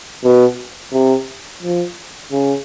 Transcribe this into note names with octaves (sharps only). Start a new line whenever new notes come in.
B2
C3
F3
C#3